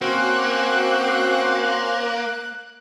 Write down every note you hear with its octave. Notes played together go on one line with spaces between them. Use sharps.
A#3 C4 C#4 F#4 C5 F#6